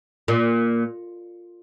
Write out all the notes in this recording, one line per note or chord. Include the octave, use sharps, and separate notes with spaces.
A#2